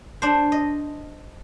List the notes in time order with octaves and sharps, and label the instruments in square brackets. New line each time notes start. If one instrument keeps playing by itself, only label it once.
[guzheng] D4 C5
D#5